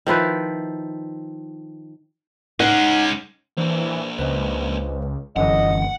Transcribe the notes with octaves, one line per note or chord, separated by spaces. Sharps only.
D#3 F3 E4 B4
G#3 C#4 D#4 F#5
E3 A#3 D4 C5
C#2 B4 C5 D#5
F1 F#2 D3 E3 D#5 F#5